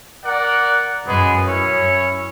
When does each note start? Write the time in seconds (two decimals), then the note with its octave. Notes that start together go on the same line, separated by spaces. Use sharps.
0.24 A#4 D5 F#5
1.07 F#2 G#3 B3 G#4
1.47 C#4 E4 C#5